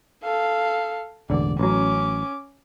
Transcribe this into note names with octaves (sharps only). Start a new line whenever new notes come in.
A4 F5
E1 A1 D3 D5
A1 F#3 C#4 D6